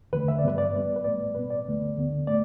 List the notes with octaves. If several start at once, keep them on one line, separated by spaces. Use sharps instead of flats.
E2 D3 A3 B4
E5
D5
G2 G3 B3 B4
D5
A2 G3 B3
B4
A2 A3 D5
B2 B3 B4
D5
D2 D3 A3
D2 D3 B3
A2 A3 D5